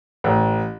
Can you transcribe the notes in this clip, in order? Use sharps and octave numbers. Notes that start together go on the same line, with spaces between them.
A1